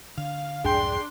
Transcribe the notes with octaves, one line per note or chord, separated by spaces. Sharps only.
D3 F5
C2 F2 G#2 D4 G#4 G5 C6